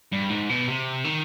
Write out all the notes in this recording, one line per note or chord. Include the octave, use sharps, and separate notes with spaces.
G2
G#2
B2
C3
D#3